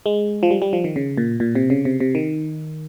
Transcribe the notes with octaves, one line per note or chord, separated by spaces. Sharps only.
G#3
F3
G3
G3
F3
D#3
C#3
A#2
A#2
C3
C#3
C3
C3
D#3